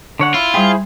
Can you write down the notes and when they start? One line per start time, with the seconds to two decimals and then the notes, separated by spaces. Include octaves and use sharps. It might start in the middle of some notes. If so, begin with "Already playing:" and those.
0.19 D3 C#5 F#5
0.34 E4 F4
0.54 G3 E4 G#4 C5 G5